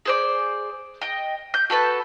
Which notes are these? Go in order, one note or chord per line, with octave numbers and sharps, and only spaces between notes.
G#4 C5 D5
D#5 G5
G6
F#4 A4 B4 A5